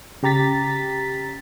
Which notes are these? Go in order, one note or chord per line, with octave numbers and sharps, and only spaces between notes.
C#3 G4 A#5 A6 B6